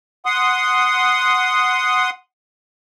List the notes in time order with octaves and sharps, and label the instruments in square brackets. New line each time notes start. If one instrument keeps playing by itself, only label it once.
[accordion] F#5 C6 D#6